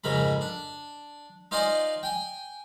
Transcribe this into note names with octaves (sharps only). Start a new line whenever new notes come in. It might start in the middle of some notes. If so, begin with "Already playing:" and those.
F2 G#2 C#3 A#4 B5
D4
D#4 F4 C5 D5 D#5 G#5
G5 G#5